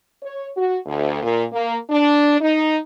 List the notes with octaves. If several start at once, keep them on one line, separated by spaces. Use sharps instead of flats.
C#5
F#4
D2
A#2
A#3
D4
D#4